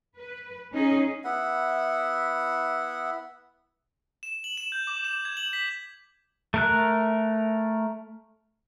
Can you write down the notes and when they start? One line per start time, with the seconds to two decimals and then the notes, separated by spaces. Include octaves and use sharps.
0.17 B4
0.73 C#4 D#4 G#4
1.24 B3 E4 E5 F#5
4.23 E7
4.44 F#7
4.58 E7
4.72 G6
4.87 D6
5.04 E7
5.25 G#6
5.37 F#7
5.53 B6
6.54 A3 A#4 F#6